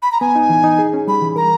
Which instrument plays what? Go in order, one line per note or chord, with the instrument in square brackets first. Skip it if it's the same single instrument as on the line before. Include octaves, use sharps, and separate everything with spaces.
[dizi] B5
A#5
[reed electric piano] B3 [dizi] G#5
[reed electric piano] D#4
E3
D#4
G#4
C#4
[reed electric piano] G3 [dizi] B5
[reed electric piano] E3
[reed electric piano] A#4 [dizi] A#5